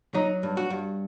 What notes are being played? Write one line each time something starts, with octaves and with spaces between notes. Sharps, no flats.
F#3 D#4
G2
F#4
G2